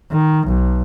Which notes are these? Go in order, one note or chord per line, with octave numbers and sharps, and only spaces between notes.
D#3
B1